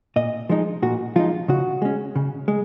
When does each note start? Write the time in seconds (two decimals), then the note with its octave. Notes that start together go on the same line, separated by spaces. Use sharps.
0.16 A#2 D#5
0.49 F3 G#3 D#4
0.82 A#2 F#4
1.16 F3 G#3 D#4 F4
1.48 C#3 F#4
1.82 G#3 C#4
2.16 C#3
2.48 G#3